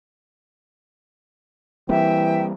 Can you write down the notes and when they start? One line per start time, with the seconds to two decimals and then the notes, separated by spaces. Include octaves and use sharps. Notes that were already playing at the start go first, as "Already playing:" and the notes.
1.89 E3 G3 A#3 C4 E5 G5